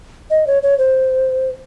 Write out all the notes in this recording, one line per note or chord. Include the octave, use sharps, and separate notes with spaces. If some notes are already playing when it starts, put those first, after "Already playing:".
D#5
C#5
C#5
C5